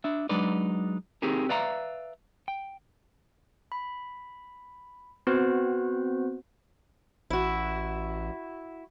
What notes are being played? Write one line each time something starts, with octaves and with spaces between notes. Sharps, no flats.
D4 E5
F#3 G#3 D4 D#4 B4 D5
C4 D#4 G4 G#4 A#4
B4 D5 E5 F5 A#5
G5
B5
B3 C4 F#4 B4 C5
A1 E4 F#4